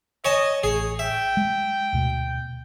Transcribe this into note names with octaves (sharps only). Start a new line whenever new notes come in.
C#5 D#5 G#5 A5
A1 G#4 C#5
E5 G5
G#3
D2 B2